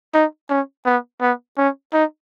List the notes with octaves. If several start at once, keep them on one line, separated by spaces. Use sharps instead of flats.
D#4
C#4
B3
B3
C#4
D#4